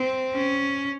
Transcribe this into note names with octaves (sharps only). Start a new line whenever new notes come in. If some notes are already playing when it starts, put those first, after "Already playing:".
Already playing: C4
C#4